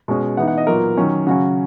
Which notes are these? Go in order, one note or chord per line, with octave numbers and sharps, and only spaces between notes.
B2 G#3 C#4
E3 B3 D#4 F#5
F#5
D#5
A#2 F#3 B3 A#4
D#3 F#3 C#4
C#3 F#3 C#4 F#4